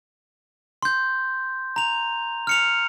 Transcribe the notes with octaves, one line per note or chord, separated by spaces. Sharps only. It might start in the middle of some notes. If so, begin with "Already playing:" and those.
C6 G6
A#5 F7
F6 C#7 F7